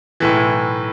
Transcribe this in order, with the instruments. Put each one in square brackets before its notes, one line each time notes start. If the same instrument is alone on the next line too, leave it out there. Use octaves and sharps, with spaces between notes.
[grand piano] B1 A2 E3